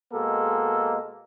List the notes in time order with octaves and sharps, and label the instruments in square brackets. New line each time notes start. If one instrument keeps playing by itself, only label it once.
[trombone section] B2 G#3 A#3 A4